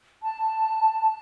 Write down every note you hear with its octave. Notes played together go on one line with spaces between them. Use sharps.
A5